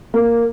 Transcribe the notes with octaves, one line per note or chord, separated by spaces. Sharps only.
A#3